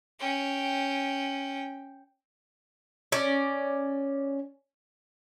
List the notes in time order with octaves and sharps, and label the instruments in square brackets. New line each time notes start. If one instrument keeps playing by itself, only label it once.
[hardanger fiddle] C#4 G5
[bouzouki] C#4 D5